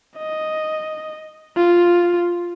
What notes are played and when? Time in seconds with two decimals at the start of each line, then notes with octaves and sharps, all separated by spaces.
0.18 D#5
1.56 F4